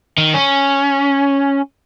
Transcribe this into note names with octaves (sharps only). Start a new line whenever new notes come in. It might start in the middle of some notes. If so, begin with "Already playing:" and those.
D#3
C#4